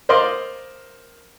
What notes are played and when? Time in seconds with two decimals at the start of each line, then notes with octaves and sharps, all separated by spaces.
0.09 A#4 C5 D5 D#5 F5 C6